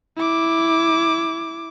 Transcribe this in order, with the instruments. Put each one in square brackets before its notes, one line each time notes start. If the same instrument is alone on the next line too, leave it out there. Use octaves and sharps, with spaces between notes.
[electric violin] E4 D6